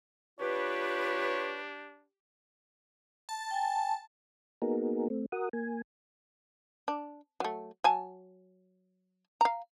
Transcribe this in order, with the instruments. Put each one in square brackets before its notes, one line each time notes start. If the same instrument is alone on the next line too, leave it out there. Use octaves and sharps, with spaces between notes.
[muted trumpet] D4 [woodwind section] F4 B4 [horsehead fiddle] G4 [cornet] C#5
[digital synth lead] A5
[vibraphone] G5 G#5
[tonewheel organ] A#3 B3 D#4 F#4 G#4 A#4
A3 C4
F#4 A#4 F#5 D#6
A#3 G#5
[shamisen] D4
F#3 A3
F#3 G#5 A5
F5 A#5